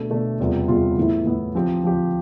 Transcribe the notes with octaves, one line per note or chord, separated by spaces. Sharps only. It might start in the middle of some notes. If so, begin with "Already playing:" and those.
Already playing: B2 A3 D4
B2 A3 D4
E2 C3 G3 B3 F4
E2 C3 G3 B3 F4
A2 E3 B3 E4
A2 E3 B3 E4
F3 C4 G4
F3 C4 G4